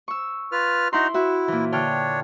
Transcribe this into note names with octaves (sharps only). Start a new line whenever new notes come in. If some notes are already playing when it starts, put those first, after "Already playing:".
C#6 E6
F4 B4 F6
D#4 E4 F#4 A#5 C6
E4 F#4 E5
A#2 E3
D3 D4 C#5 G5 F6